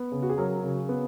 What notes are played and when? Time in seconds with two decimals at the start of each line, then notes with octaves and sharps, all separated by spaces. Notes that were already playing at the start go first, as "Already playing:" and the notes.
Already playing: B3
0.12 C#3
0.22 F#4
0.30 G#4
0.38 F#3 A#4
0.63 C#3
0.89 B3